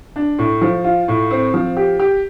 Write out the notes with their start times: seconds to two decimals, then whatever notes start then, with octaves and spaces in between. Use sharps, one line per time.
0.16 D4
0.39 A2
0.61 F3
0.84 F4
1.08 A2
1.31 C4
1.54 F3
1.77 G4
2.00 G4